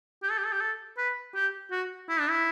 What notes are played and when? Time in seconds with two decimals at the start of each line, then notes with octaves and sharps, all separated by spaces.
0.23 G4
0.31 A4
0.38 G4
0.45 A4
0.52 G4
0.61 A4
0.97 B4
1.35 G4
1.71 F#4
2.09 E4
2.20 D4
2.29 E4